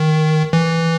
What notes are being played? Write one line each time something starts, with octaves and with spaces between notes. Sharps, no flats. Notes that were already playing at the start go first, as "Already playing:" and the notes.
Already playing: D#3
E3